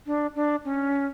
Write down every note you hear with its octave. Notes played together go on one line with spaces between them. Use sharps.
D4
D4
C#4